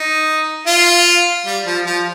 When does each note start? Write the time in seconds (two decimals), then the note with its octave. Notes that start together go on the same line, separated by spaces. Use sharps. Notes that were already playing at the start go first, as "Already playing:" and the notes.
Already playing: D#4
0.67 F4
1.46 G3
1.66 F3
1.86 F3